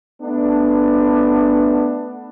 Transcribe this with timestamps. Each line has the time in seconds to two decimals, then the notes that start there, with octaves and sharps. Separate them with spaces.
0.21 A3 B3 D4